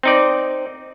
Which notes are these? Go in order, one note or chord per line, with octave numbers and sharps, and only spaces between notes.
C4 D#4 D5